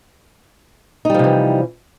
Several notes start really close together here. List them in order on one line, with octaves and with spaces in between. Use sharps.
D#4 G3 F3 C3 E3